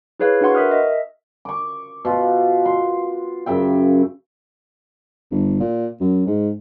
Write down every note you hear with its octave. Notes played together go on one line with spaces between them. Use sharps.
E4 G#4 B4 C#5 F5
D4 F#4 B4 F#5 C6 C#6
A#4 E5 D#6 F6
D#5 E5
C#6 D6
B2 F4
C6
F#2 C#3 E5 G5
G1
A#2
F#2
G#2